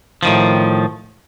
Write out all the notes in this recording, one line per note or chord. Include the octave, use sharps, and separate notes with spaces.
A2 D#3 F3